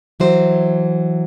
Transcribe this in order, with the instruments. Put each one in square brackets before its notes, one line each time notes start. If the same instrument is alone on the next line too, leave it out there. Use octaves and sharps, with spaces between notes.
[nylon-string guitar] E3 F#3 C5